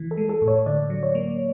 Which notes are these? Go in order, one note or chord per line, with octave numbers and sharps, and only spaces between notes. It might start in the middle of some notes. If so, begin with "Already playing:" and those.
Already playing: E3
A4
G#3
A4
A2
C#5
D3 D5
F#3
C#5
A#3